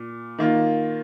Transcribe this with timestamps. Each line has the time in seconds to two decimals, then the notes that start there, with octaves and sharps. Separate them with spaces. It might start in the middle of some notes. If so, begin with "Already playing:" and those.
Already playing: A#2
0.38 D#3 A#3 F4